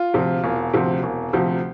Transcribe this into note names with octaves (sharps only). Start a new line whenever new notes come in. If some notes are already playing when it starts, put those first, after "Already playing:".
Already playing: F4
D2 C3 F3
E1
D2 C3 F3
E1
D2 C3 F3